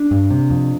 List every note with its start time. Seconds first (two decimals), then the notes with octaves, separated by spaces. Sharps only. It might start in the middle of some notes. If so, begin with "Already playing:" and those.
Already playing: D4
0.11 G2
0.31 C3
0.50 F2